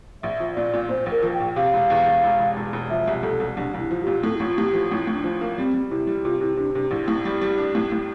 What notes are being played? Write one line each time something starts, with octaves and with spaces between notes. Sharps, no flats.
A#1 E5
F3
A#2 D5
A#2
A#2 C5
A#1
A#4
F3
G5
A#1
C3 F5
E1
E2
E2
E1
E1
E1
E1
F3 E5
C2
C2 A4
C2
C2 D4
C2 E4
F3
A#2 G4
A2 A4
A1 E4
F4
A2 G4
F3
A1 E4
A2
D4
F3
A#3
G3 C4
G3
C3 E4
G3
C3 F4
C3 E4
C3 D4
C3 D4
A#1 E4
A2
G3
G3
D4
A2
A2